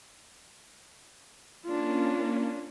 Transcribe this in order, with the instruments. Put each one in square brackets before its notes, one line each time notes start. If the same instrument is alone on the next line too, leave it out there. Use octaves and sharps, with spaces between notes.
[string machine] A#3 C#4 [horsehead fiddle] D4 F4